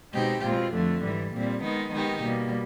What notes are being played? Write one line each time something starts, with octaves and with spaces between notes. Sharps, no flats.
B2 G#3 C4 D#4 G4
B2 G#3 C4 F4
F2 D3 F3 A3
G#2 E3 G3
A#2 G3 C4
D#3 G#3 B3 D#4
D#3 G#3 B3 D#4 G4
B2 G3 A#3